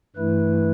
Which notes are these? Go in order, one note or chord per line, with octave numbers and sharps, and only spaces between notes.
G2 E3 A3 E4 B4